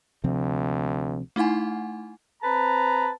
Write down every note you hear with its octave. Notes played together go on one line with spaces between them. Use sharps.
D2 C3 F3 C4
A3 D#4 E4 F#5 G#5
C4 B4 A5 A#5